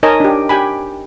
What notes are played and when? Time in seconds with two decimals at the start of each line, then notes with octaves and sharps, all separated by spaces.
0.03 D#4 A#4 C#5 D#5 G#5 A5
0.20 D4 G4
0.49 G4 G5 G#5 B5